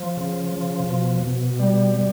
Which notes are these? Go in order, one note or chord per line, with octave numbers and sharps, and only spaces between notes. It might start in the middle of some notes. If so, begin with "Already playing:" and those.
Already playing: F3
C#3
F3
B2
B2
G3
G3